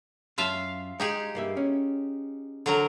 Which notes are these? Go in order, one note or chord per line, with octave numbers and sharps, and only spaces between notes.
F#2 F4 E5 F5 A5
G#3 D#4 G4 G#4
G2 A#3 E5
C#4
D3 F#3 A#4